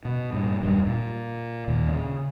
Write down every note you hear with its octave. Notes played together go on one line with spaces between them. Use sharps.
B2
G2 A#2
D#1 F#2 F#3 G3
A#2
D#2 A#2
C#3